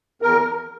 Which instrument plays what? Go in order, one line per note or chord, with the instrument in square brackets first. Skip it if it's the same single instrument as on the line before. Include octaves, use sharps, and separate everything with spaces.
[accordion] E2 A#4